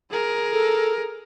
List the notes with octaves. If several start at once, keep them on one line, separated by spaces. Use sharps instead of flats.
G#4 A#4
A4